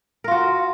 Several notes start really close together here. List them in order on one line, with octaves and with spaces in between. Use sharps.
A#4 F4 F#4